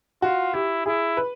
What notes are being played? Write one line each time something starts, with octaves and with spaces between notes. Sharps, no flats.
F4 F#4
E4 G4
E4 G#4
B4